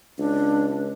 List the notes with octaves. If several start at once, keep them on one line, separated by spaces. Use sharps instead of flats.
C#2 D4